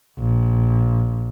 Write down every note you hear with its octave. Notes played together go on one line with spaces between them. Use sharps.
A#1